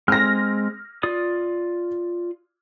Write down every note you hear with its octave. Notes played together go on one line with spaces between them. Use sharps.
G#3 C4 F6 A#6
F4 D5 D#6